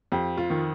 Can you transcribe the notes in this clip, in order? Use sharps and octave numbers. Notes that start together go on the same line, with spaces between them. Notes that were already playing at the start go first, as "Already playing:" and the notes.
F2 G4
F4
D#3